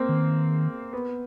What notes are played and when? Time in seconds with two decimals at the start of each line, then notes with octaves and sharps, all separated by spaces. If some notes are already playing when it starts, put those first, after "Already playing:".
Already playing: A#3 C4
0.09 D#3
0.93 B3